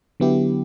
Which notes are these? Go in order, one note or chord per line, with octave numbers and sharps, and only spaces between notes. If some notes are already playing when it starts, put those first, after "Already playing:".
D3 F#3 B3 E4 G4